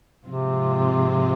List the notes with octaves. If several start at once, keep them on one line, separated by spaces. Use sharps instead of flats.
G#2 C3 F3 G#3 C4 F4